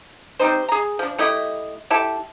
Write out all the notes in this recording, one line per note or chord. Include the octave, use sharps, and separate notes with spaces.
G3 C4 D#4 C5
G#4 A#5
F3 D4
A3 E4 G4 D#5
E4 G4 A4 A5